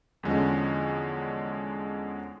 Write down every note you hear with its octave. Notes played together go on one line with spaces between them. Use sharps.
E2 D3 F3 G#3 C#4